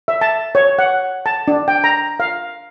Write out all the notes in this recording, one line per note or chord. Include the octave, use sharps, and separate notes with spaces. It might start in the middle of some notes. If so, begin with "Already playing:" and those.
E5
A5
C#5
F#5
A5
D4
G5
A#5
F5